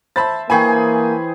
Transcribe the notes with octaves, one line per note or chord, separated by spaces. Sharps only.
C5 E5 A5 B5 A6
E3 A#3 G#4 G5 G#5 B5 C#6